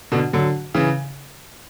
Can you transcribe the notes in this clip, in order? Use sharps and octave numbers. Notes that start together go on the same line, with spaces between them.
B2 D3
D3 F#3
C#3 E3